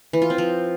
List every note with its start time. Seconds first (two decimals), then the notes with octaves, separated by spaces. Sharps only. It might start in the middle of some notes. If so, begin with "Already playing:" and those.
0.13 E3
0.22 F4
0.30 C4
0.38 F3